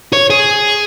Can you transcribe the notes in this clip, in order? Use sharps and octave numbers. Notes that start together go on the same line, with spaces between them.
C#5
G#4